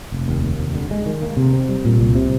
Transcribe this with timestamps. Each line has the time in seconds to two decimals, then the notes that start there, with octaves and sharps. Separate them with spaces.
0.12 F1
0.28 D#2
0.43 D#2
0.60 F1
0.75 D3
0.91 G#3
1.06 D#3
1.22 A#3
1.37 C3
1.53 C4
1.69 G3
1.85 A#2
2.00 C2
2.15 C3